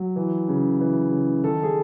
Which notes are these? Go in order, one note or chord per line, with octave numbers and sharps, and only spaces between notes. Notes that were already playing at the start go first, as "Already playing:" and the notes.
Already playing: F#3
E3
C#3
E3
C#3
D#3 A4
G#4